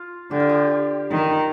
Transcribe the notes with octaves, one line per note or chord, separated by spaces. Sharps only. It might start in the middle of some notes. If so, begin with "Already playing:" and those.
Already playing: F4
D3 G4
F4
G4
D#3 D#4